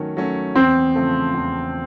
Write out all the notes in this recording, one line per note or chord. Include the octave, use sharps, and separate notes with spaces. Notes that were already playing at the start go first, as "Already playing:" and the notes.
Already playing: D#3 F#3 A3 C#4
F#3 A3 C#4
E2 C4
C#3 F3 A3
E2